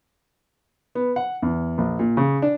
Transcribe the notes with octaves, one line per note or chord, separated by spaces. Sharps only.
B3
F#5
E2
A#1
A#2
C#3
D4